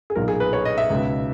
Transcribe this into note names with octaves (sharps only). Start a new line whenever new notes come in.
G#4
B1 A#2 A#4
G#4
B4
C#5
D#5
E5
C#2 B2